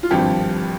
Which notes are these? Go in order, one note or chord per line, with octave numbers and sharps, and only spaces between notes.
F4
G#1 G2 F3 G4